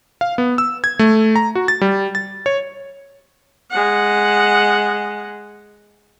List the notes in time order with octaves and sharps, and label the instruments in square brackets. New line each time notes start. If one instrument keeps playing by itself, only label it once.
[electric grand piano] F5
B3
E6
G#6
A3
A#5
F#4
A6
G3
A6
C#5
[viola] G#3 F#5